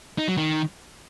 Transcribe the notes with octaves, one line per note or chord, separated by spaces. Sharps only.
D#4
F#3
D#3